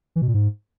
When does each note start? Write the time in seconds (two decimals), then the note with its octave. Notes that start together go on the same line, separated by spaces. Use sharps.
0.16 E3
0.22 B2
0.28 A#2
0.34 G#2